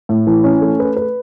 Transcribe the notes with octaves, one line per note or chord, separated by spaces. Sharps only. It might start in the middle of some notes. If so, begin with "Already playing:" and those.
A2
E3
C#4
A3
B4
B4